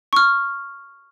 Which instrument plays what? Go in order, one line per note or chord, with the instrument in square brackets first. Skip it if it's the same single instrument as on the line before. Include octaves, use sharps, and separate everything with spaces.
[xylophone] C#6 F6